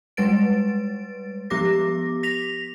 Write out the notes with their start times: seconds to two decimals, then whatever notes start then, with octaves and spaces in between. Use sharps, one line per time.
0.17 G3 G#3 B4 A6 D7
1.50 F3 B3 G4 D6 A#6
2.23 A#6 B6 F7